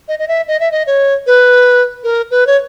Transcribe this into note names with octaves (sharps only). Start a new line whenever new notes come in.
D#5
D#5
E5
D#5
E5
D#5
C#5
B4
A#4
B4
C#5